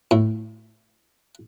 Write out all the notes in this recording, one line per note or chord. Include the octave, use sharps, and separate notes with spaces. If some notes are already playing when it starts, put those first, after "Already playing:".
A2